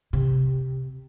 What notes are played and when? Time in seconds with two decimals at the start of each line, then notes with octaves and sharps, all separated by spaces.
0.13 C3